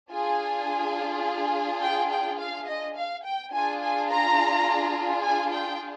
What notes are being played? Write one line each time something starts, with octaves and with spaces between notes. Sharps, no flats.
D4 F4 G#4 G#5
G5
G5
F5
D#5
F5
G5
D4 F4 G#4 G#5
G#5
A#5
G#5
G5